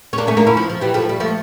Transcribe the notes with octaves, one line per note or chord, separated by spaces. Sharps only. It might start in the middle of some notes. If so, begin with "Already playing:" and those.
C#4
A#3 D4
A3 C#4
A#3 D4
C#4 E4
F3
F3
E3 G3
F3 A3
G3
F3 A3